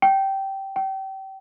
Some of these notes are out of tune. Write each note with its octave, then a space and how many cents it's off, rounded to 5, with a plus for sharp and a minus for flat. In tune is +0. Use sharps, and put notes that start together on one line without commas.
G5 -15
G5 -30